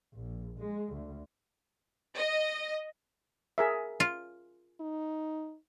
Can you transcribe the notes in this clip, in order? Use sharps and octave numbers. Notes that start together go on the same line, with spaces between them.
A#1
G#3
D2
D#5
G#4 A#4 E5
F4
D#4